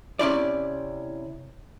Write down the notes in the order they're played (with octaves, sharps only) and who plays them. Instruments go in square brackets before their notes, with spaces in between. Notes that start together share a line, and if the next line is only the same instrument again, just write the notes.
[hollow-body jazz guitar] C3 C#4 E4 D5